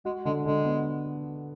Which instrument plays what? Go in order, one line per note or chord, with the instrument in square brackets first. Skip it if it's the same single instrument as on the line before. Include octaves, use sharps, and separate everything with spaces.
[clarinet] G#3 [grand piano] F#4
[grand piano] D3 [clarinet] G#3
[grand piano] D3 [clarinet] G#3
[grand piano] B3